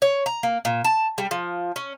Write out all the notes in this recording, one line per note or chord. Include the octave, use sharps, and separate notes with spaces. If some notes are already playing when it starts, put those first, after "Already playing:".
C#5
A#5
A#3
A#2
A5
G3
F3
C#4